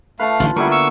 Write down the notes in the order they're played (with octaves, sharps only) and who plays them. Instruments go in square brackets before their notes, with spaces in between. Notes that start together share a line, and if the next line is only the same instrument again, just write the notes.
[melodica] A3 F5 [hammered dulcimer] B4 A5
[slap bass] A1 D3 D#3 [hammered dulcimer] F4
[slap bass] D3 [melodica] G3 C#6 [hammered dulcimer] A#3 B3 E4
[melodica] C#6 E6